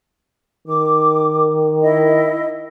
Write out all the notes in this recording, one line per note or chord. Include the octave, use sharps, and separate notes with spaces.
D#3 D6
E4 D#5